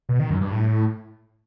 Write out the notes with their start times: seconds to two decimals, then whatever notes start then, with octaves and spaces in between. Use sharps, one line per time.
0.09 B2
0.20 D#3
0.30 F#2
0.41 G2
0.52 A2